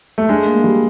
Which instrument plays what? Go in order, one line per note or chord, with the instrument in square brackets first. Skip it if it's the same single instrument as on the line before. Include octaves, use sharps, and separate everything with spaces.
[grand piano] A3
[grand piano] G#3 [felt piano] D4
[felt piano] A#3
G3